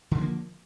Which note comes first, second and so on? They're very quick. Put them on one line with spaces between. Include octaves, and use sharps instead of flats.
D3 F3 D4 A#3